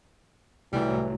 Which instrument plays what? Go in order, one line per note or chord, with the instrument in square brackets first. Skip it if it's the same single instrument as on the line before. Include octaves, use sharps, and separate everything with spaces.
[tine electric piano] C2 A2 F#3 [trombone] E3 [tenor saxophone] G3